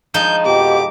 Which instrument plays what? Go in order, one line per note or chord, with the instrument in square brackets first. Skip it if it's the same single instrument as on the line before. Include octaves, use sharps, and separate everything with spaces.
[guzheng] F3 G#3 D#4 [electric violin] G6
[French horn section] F2 B2 G4 [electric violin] D6